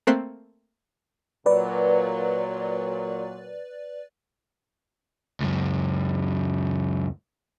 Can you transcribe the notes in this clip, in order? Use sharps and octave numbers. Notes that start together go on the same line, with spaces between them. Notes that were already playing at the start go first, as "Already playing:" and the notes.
A3 A#3 C4 C6 F#6 B6
A#2 F#3 B4 D5
C#2 F#2